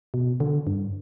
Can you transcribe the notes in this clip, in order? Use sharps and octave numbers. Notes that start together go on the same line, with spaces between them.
B2
D3
G2